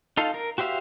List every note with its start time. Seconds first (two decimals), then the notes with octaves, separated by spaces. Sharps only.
0.17 D#4 F4 A4 F5
0.34 A#4
0.58 F#4 G4 C5 E5 F5